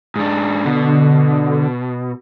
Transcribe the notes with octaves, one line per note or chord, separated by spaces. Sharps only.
G#2 D4
B2 D3